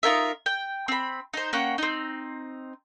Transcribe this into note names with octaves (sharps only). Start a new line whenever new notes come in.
D#4 F4 A#4 E5
G5
C4 B5
D#4 C5
A#3 C#4 F#5 G5
C4 D#4